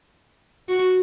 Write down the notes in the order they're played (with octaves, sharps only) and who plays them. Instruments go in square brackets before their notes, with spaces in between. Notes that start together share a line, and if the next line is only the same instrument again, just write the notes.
[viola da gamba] F#4